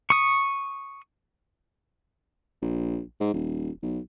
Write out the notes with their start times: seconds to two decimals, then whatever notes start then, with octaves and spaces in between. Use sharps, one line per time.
0.10 C#6 D#6
2.62 A#1
3.20 G#2
3.34 D#1
3.83 B1